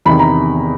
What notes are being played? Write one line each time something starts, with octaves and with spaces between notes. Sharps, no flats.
E2 C3 D#3 B5
A#5